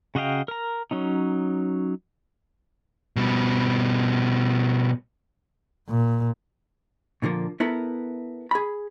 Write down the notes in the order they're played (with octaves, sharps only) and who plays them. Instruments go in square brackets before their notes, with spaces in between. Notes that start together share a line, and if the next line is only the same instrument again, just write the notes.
[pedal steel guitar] C#3 F#4 D#5 F5 G5
A#4 A#5
F#3 C#4 D#4
[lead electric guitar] B2 G3
[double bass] A#2
[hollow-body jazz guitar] A#2 D3 F3 A#3
B3 E4 A4 A#4
G#4 B5